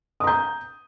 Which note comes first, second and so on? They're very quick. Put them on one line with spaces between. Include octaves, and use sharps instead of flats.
D#6 A#5 G6